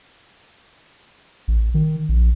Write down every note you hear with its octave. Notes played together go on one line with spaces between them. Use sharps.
A1
D#3
A#1